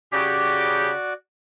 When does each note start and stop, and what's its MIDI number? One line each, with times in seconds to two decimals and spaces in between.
0.13 0.92 49
0.13 1.13 66
0.13 0.92 67
0.13 1.13 74